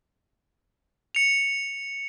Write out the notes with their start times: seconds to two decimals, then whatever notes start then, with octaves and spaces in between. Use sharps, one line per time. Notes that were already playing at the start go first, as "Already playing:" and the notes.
1.15 C#7 F7